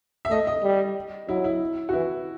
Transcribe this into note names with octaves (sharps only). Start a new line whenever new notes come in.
E5
A3 D#5
D#5
G3
F#3 E4
E4
F#4
E3 E4